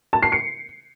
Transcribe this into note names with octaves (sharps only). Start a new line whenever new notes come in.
A5
C7
C#7